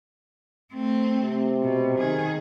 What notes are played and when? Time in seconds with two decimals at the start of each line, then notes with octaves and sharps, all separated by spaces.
0.73 A3 C4
1.23 C3
1.63 B2
1.98 D#3 G#4